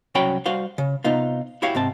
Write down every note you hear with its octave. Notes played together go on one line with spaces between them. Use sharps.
C2 F#3 C#4 F#4 G5 B5
G3 F#4 C5 F5
C#3
C3 B3 D#4 F4
E4 F#4 G4 C#5 F5 G5
G#2 C3 C4 A5